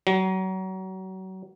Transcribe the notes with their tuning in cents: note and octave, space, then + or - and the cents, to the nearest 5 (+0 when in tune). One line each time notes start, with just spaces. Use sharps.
F#3 +30